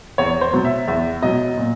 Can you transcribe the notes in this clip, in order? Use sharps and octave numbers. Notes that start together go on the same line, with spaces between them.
E2 C#5
C5
B2 F#3
E5
E2 E5
B2 F#3 D#5
A#2